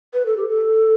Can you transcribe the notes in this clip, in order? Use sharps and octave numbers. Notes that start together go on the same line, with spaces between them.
B4
A4
G4
A4